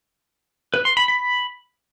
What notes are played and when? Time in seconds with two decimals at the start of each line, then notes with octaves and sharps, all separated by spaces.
0.74 B4
0.85 C6
0.97 B5
1.08 B5